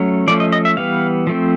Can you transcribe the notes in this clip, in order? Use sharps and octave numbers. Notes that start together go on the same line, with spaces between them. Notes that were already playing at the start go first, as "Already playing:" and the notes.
Already playing: F#3 A3 C#4
F3 A3 C#4 D5
D#5
D#5
E5
E3 G3 B3 F5
F3 A3 C4